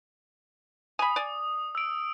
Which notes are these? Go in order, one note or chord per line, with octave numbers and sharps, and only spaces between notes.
G#5 B5 D#6
D5 G#5
E6 D7